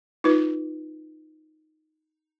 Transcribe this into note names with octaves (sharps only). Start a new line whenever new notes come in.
D#4 F4 B4